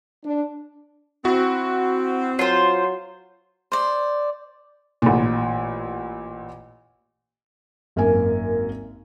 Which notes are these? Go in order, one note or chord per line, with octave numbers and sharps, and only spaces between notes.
D4
C4 E4 F#4 F#5
F#3 F4 C5
C5 D5
A1 A#2
G#1 F#2 A#3 A#4 G#5